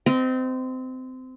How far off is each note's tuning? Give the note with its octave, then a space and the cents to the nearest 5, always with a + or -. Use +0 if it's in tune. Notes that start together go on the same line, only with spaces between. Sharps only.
C4 -25 D#5 +0